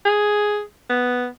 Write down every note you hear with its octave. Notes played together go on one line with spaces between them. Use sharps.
G#4
B3